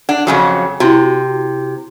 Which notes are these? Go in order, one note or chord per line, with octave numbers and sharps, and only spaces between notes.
D4 F#5
F2 C#3 F#3 A4 G#5
C3 E4 F#4